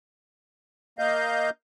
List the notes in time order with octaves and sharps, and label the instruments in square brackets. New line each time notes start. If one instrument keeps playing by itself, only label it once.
[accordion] A#3 D#5 F5 G6